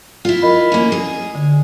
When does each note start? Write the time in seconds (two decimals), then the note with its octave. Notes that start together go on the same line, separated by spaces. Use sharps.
0.25 E4 F4
0.42 A#4 D#5 B5
0.72 A#3 C#4
0.92 G#4
1.35 D3